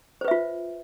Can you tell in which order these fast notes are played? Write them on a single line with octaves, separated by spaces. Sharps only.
C5 B4 E5 F4